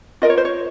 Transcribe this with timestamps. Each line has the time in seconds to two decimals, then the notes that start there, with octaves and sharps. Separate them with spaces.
0.22 F4 A#4 D#5
0.30 C#5
0.37 C5
0.45 C#5